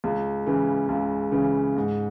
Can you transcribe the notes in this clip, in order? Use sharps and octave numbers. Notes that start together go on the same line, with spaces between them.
C#2
C#3 E3
C#2
C#3 E3
G#2